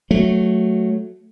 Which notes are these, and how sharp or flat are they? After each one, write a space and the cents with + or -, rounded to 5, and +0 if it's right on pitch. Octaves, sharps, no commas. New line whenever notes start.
F#3 +0 A3 -5